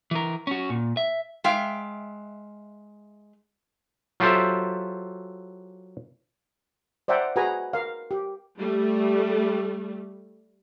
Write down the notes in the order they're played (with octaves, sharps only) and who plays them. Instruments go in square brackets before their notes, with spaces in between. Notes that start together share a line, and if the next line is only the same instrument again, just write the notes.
[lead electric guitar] E3 A#4
C#4 F#4
A#2
E5
[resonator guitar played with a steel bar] G#3 E5 F5 G5
[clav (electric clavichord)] F#3 F4 G4 A4 C5 E5
[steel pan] C5 D5 E5 F#5 G5 A#5
F#4 G#4 B4 F#5 G#5 A#5
A#4 F5
G4
[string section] G3 A3